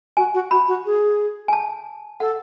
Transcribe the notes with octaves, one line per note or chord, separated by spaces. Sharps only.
F#4 G#5
F#4
F#4 B5
F#4
G#4
G#5
A5
A4 F#5